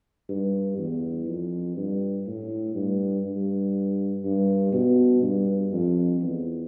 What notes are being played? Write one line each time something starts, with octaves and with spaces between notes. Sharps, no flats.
G2
E2
F2
G2
A2
G2
G2
G2
B2
G2
F2
E2